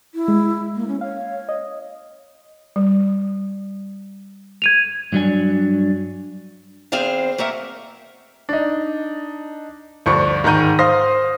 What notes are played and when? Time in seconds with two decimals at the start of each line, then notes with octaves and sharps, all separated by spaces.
0.15 E4
0.28 G#3
0.75 A#3
0.88 C#4
1.01 C#5 F5
1.49 D#5
2.76 G3
4.62 G#6 D#7 F7
5.13 G2 F#3 D4 G#5
6.92 E2 C4 G#4 C5 F5
7.38 A3 A#3 A#4 E5 F#5
8.49 D4 D#4
10.06 D2 G2 F3 C#6 C#7
10.44 G#2 D#3 G#3 A#5 G6 D#7
10.79 C5 F5 C6 D#6 A#6